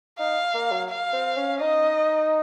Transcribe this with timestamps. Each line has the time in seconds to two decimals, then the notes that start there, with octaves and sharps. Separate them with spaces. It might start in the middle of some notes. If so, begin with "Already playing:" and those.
0.18 D#4 F5
0.54 A#3
0.71 F#3
0.90 F5
1.13 C4
1.37 C#4
1.61 D#4 D#5